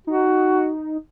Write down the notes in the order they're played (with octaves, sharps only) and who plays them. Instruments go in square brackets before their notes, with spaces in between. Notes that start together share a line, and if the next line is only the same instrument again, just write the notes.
[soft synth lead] D#4 [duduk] F#4